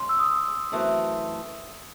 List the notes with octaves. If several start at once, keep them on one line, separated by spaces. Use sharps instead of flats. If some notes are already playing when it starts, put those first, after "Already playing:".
Already playing: C#3 G#3 C#4 C6
E6
D#6
F#2 E3 A3 C4